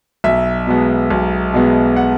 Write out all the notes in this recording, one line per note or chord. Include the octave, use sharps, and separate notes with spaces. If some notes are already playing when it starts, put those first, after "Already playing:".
B1 E5
B2 G#3 B3
B1
B2 G#3 B3
F#5